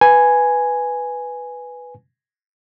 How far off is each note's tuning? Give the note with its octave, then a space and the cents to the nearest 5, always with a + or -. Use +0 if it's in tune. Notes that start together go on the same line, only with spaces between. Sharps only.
B4 +0 G#5 +0